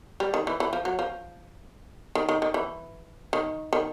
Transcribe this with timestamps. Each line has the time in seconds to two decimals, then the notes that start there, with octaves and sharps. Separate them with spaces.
0.20 G3
0.34 D#3
0.47 E3
0.60 E3
0.73 F3
0.85 F#3
0.99 F3
2.15 D#3
2.29 D#3
2.42 D#3
2.54 E3
3.33 D#3
3.73 D#3